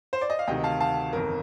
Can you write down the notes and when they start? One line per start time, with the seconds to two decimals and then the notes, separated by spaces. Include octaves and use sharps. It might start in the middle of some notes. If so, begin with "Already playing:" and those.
0.13 C5
0.21 D5
0.30 D#5
0.39 F5
0.48 D2 C3 D#3 D#5 G5
0.64 F5 A5
0.80 F5 A5
1.13 G1 F2 D#3 A#4